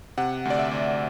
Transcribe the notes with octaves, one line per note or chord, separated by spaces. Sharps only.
C3 F#5
D2 D5
E5
D2